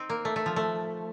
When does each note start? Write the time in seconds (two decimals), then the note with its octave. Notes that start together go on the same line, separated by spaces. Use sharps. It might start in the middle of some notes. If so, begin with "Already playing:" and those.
Already playing: C4 D#4
0.10 A#3
0.25 A3
0.36 A3
0.46 F3
0.56 A3